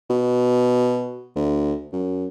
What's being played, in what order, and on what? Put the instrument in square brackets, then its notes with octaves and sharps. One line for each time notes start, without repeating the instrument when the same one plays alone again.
[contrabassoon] B2
D2
F#2